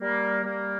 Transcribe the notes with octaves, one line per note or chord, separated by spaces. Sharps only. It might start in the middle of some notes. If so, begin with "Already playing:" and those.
G3 A#3
G3 A#3